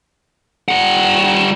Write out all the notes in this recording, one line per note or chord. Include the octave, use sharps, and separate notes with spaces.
G3 F#5